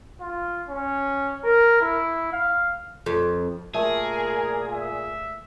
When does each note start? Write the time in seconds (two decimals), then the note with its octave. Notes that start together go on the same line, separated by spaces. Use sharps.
0.21 F4
0.69 C#4
1.44 A#4
1.81 E4
2.33 F5
3.06 F2
3.74 A#2 A3 G#4 A#4
4.72 E5